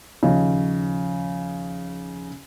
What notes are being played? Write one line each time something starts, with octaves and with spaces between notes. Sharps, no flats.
D#2 C#3 F3 D#4